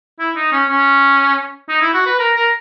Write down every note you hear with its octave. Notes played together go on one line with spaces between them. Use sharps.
E4
D#4
C#4
C#4
D#4
E4
F#4
B4
A#4
A#4